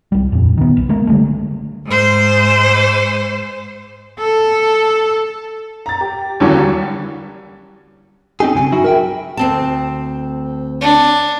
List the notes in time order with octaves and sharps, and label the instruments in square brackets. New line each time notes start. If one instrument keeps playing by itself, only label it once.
[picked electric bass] C2 G3
D#1 F2 A#2
D#3 B3
B1
G#3 A#3
D3 G3 A3
[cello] G#2 C5
A4
[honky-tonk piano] A#5 A6
G4
D#2 D3 E3 F#3 C#4
G3
[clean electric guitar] C4 C#4 D#4 G4 G#4
B1 G2 C#3 G#5
F#3 D#4 E4 F#4
A#4 E5 G5
[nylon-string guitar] D2 C4 A5
[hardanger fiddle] D4